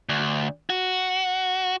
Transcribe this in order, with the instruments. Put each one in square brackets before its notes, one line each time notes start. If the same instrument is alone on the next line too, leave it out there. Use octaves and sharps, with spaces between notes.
[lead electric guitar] D2
F#4